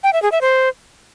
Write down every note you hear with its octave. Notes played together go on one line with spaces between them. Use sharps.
G5
E5
G#4
E5
C5